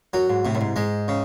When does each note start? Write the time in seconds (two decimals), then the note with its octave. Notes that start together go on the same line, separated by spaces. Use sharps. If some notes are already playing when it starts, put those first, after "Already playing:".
0.13 F#2 F#3
0.29 G#2
0.45 A2 C3
0.54 F#2
0.61 G#2
0.76 G#2 G#3
1.08 C#3